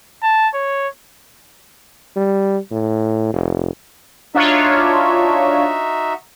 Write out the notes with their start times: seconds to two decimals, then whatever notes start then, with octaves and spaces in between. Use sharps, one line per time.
0.23 A5
0.54 C#5
2.16 G3
2.72 A2
3.33 F1
4.35 D4 D#4 F4 F#4 C#5 E5